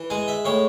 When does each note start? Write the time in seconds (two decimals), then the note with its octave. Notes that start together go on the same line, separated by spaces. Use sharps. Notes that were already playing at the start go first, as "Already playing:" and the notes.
Already playing: E3
0.10 G#3 G#5
0.28 E5
0.45 A2 C#5